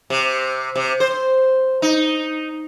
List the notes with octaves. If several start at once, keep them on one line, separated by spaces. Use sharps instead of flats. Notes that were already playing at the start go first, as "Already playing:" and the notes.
C3
C3
C5
D#4